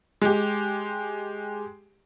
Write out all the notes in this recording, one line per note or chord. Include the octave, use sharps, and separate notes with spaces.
G#3 G4